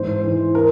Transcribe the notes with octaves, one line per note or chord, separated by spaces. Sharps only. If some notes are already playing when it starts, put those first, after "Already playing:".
Already playing: G#2 E3 C5
E3
A#4